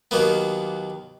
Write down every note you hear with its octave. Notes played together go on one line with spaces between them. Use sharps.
D#2 D#3 F#3 A#3 B3